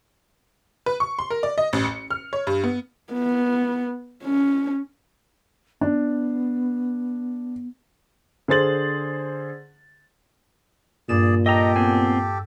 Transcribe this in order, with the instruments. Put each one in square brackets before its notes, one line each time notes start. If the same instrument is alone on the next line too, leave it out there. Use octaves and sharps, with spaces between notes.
[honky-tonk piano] B4
C#6
C6
A#4
D5
D#5
A1
C#7
F6
C#5
G2
B3
[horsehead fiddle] B3
C#4
[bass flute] B3 [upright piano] D4
[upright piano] D3 G#4 C5 A6 F#7
[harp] G2 D#7 E7 [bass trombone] A#2 [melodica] G#4 D5
[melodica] G4 A4 [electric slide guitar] D#5 A#5 [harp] G5
[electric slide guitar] B3 C4 G#5